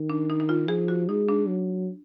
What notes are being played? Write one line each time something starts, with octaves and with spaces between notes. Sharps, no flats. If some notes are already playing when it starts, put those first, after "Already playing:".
Already playing: D#3
D4
D#4
D#4
F4
F3 G#4
F#4
G#3 D#4
D4
F#3